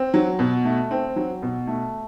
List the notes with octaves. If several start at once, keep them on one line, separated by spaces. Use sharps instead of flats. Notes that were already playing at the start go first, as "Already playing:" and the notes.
Already playing: C4
F#3
B2
A3
C4
F#3
B2
A3